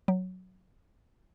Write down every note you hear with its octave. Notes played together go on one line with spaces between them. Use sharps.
F#3